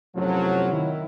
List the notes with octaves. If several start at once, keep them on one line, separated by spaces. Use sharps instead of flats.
F#2 A2 C3 F3 F#3
D#3 E4